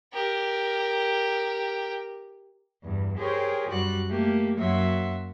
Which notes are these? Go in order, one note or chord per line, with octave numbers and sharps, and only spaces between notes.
G4 A#4
E2 G2
G4 G#4 A#4 C5 C#5 G5
F#2 G3 F#4 D5 F#6
A3 A#3 G4
F#2 F#3 A#3 E5 F#5 C6